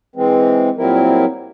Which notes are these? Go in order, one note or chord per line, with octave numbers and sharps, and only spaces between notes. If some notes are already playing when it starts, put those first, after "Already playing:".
E3 G#3 C4
A#2 F#3 G3 C4 E4 A#4